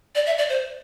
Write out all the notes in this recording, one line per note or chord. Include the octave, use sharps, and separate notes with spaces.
D5
E5
D5
C5